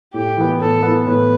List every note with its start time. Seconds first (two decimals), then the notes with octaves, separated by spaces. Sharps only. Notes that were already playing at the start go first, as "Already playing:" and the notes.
0.14 A2 G4
0.37 E3 B3
0.60 A2 A4
0.83 E3 B3
1.06 A2 B4